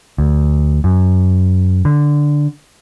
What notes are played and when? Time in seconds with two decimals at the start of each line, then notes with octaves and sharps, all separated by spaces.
0.18 D2
0.84 F#2
1.85 D3